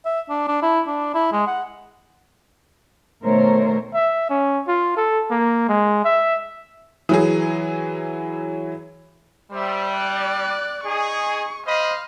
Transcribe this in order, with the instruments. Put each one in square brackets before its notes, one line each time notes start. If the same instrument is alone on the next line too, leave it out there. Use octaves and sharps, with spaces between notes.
[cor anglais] E5
D4
D4
E4
D4
E4
G#3
F#5
[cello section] B2 D#3 A3 A#4 C5 C#5
[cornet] E5
C#4
F4
A4
A#3
G#3
E5
[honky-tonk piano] E3 F#3 G#4
[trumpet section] G3 [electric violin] C5 E5
[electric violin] D5 F#6
[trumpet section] D#4 G#4 [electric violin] C#6
[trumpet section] C5 D#5 B5 [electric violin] F5